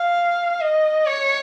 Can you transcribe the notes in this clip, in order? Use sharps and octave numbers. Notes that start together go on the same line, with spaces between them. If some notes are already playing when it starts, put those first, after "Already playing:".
Already playing: F5
D#5
C#5